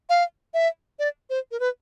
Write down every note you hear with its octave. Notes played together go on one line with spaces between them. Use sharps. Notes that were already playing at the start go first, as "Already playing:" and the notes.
F5
E5
D5
C5
A#4
B4